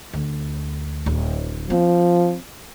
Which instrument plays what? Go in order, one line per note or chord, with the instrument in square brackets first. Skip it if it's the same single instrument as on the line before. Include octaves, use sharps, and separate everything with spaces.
[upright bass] D2
D1
[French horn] F3 [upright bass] C4